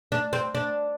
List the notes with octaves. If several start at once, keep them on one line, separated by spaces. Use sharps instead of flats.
D4
C4
D4